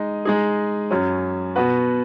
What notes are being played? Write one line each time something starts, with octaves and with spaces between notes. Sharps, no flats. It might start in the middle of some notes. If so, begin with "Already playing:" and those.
Already playing: G#3 D#4
G#3 D#4 G#4
F#2 F#3 C#4
B2 B3 F#4 B4